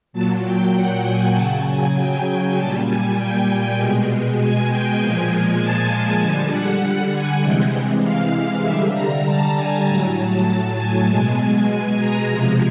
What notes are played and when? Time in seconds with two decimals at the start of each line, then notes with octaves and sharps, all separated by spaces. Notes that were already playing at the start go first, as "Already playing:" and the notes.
0.13 A#2 F#3 A5
0.44 G5
0.74 F#5
1.04 G#5
1.34 C#3 A5
1.39 F#3
1.65 G#5
1.96 G5
2.26 G#5
2.56 A#2 G3 A5
2.87 G#5
3.17 G5
3.47 G5
3.78 B2 G#3
4.39 G#5
4.69 G5
4.99 A#2 F3 G#3 G#5
5.60 A5
6.21 D3 G3 G#5
6.51 F#5
7.12 G#5
7.42 C3 E3 G#3 G5
8.03 F5
8.64 D3 G3 E5
8.94 A#5
9.24 A5
9.55 G#5
9.85 A2 F#3 A#5
10.16 A5
10.77 G#5
11.07 B2 G#3 G#5
11.98 A#5
12.28 C3 F3 G#3